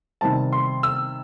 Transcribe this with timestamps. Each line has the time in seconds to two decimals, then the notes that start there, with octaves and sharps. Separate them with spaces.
0.21 C3 D#3 G3 C4 A5
0.52 C6
0.83 E6